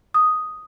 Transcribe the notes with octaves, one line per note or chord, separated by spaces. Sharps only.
D#6